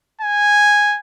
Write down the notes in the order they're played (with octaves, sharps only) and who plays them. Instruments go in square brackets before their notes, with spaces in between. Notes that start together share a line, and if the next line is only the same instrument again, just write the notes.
[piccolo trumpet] G#5